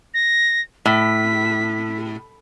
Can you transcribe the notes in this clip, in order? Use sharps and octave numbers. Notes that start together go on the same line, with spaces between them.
A#6
A2 B6